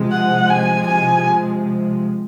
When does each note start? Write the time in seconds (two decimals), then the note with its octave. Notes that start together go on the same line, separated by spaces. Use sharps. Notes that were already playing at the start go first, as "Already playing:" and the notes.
Already playing: C3 F3 G#3
0.11 F#5
0.49 G#5
0.88 G#5